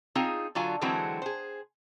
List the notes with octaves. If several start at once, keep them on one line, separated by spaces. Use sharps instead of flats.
C4 D#4 F4 G#4
D3 F#3 F4 G#5
D3 E3 F#3 G#3 C4 F#4
G#4 C5